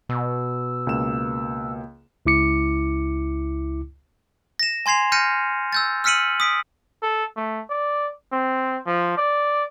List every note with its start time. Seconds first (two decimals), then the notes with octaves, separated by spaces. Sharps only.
0.09 B2 E6
0.87 C#2 A#3 E7
2.26 C#2 E4 D6 C#7
4.59 A#6 E7
4.86 G#5 C6 G#6 C7 F7
5.12 F6 G6 A#6 C#7 D#7
5.73 E6 G6 A6
6.04 E6 F6 B6 C#7 D#7 F#7
6.40 D#6 B6 D7
7.03 A4
7.36 A3
7.70 D5
8.33 C4
8.86 F3
9.17 D5